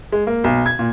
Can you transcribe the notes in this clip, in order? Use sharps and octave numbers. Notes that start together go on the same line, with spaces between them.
G#3
A#3
B1
G#6
A#2